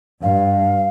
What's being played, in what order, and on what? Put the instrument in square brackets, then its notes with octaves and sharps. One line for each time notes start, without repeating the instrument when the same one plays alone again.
[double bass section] G2 [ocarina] F5